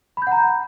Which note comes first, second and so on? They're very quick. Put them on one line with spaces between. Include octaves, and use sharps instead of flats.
B5 G6 F#5 A#5